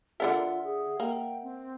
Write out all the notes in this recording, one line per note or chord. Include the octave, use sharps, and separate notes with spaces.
D3 D4 F4 A#4 E5 F#5
G#4
A#3 G5
C4